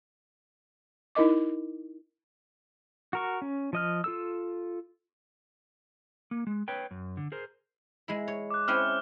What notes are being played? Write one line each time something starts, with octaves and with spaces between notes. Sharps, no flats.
D#4 E4 A#4 D#5 D6
F#4 A#4 C#6
C#4
F3 D#5 F6
F4 A4 E6
A#3
G#3
B4 C#5 G5
F#2
D3
G#4 A#4 C5
G#3 E4
C#5
D6 F#6
C4 C#4 E4 F6 G6